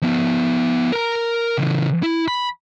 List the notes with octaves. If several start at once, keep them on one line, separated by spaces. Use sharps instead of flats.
F3 B3
A#4 A#5
C#3 E3
E4
B5